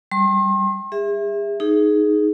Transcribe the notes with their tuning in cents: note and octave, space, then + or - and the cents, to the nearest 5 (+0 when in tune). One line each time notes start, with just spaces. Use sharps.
G3 +0 C6 +40
G#4 -40 E5 +0
D#4 +0 G#4 +10